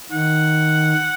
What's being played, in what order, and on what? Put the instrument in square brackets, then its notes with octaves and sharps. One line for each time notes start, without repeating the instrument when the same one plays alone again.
[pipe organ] D#3 [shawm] F#5